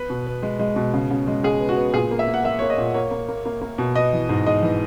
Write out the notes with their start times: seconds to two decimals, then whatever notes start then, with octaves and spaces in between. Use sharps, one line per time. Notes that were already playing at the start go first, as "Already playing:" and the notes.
Already playing: B3 B4
0.10 B2
0.27 B3
0.43 G#3
0.59 G#3
0.76 B2
0.93 C#3
1.10 C#3
1.27 G#3
1.43 G#3 G#4
1.60 B3
1.69 F#4
1.77 B3
1.93 A#2 G#4
2.11 A#3
2.19 E5
2.28 A#3
2.34 F#5
2.44 A#3 E5
2.59 A#3 C#5
2.70 D#5
2.78 A#2
2.94 A#3 C#5
3.11 A#3
3.29 A#3
3.45 A#3
3.61 A#3
3.78 B2
3.95 B3 D#5
4.13 E3
4.29 G#2
4.46 G#3 D#5
4.63 E3